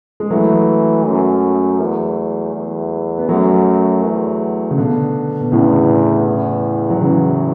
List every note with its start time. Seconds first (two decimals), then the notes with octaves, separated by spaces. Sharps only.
0.20 G#3
0.30 E3 F#3 A3
1.05 F#2
1.80 E2
2.54 E2
3.18 B3
3.28 F#2 F#3 A3
4.03 E2
4.71 C#3
4.77 B2 D3
5.41 B2
5.52 E2 A2 C#3
6.27 E2
6.90 F#3
7.00 E2 C#3 E3